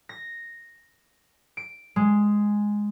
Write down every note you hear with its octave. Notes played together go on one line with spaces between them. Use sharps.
A#6
D7
G#3